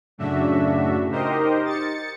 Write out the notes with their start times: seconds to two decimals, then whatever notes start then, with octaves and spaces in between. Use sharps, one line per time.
0.18 F#2 A2 C#3 D4 F#4 E5
1.11 D#4 G4 A#4 C5 D#5
1.65 A6 C#7